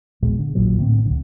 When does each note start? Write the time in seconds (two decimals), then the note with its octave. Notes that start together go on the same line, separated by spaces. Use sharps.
0.23 D#1 A#1 B2 G#3
0.39 D3
0.55 A#1 D#2 A#2 F#3
0.78 A2 D3 C4
1.06 C#2 D3